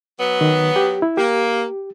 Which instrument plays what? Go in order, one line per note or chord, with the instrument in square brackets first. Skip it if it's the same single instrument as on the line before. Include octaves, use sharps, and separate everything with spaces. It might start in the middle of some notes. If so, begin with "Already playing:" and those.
[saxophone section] F#3 B3
[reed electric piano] D#3
G4
E4
[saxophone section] A#3 [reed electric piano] G4